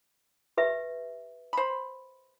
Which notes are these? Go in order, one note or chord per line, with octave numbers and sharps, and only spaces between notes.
G4 B4 E5
C5 B5